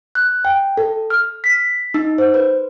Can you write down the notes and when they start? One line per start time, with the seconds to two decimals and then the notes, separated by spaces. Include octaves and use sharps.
0.15 F#6
0.45 G5
0.77 A4
1.10 F6
1.44 B6
1.94 D#4
2.18 C5
2.34 B4